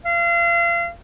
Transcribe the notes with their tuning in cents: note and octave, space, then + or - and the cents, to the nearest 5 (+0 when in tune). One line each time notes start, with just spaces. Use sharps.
F5 -35